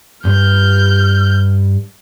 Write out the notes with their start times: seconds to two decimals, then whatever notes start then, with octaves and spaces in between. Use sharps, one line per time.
0.25 G2 F6 G6